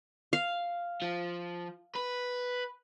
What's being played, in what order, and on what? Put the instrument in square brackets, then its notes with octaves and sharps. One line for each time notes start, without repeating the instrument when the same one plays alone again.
[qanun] F5
[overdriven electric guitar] F3
B4